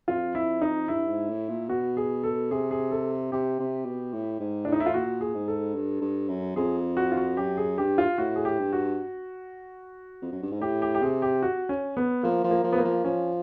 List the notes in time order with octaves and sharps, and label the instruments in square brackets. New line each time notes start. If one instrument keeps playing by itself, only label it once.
[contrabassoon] F2 [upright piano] F4
[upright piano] E4
D#4
[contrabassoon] G2 [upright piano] E4
[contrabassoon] G#2
A2
A#2
[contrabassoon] B2 [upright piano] F#4
[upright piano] G#4
A4
[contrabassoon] C3 [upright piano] G#4
[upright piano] G#4
A4
[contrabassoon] C3 [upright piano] G4
[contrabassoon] C3
B2
A2
G#2
[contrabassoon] A2 [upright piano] D4
[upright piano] D#4
E4
F4
[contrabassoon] A#2 [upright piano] F#4
[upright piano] G#4
[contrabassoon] G#2
[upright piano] A4
[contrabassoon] G2
G2
F#2
[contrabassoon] F2 [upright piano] G#4
[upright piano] F#4
F4
F#4
[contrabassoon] F#2 [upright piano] G4
[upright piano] G#4
[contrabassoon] G2 [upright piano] G4
[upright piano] F4
[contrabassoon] A2 [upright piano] F#4
[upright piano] G#4
G4
[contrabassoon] G2
[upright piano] F#4
[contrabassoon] F2
F#2
G2
G#2
[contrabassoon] A2 [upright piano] G4
[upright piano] G4
G4
[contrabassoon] C3 [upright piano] G#4
[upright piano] G4
F#4
C#4
B3
[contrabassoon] F3 [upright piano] A#3
[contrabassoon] F3
[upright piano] A#3
[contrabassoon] F3
[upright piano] B3
A#3
[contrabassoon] F3
[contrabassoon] F3 [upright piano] C#4